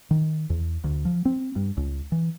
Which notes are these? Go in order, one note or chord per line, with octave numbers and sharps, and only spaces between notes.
D#3
E2
D2
F3
C4
G2
C#2
E3